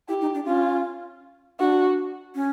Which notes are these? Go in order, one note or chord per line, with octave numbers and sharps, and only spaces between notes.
E4 G4
D#4
D4
C#4 F4
D4 F#4
C#4